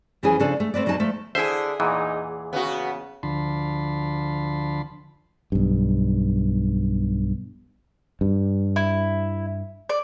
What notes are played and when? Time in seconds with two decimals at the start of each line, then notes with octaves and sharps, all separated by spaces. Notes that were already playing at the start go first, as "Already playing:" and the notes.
0.23 F2 E3 F#3 C#4 G#4
0.40 C#3 F3 D4 A4
0.60 A3
0.74 A3 C4 B4 D5
0.86 F2 F#3 D4 D#4 A5
1.00 F3 A3
1.35 D3 E4 G#4 C5 E5
1.80 E2 A#2 E3 D#4
2.53 C#3 B3 F#4
3.23 D2 D3 F3 A5 B5 C6
5.52 B1 G2
8.21 G2
8.76 E4
9.89 D5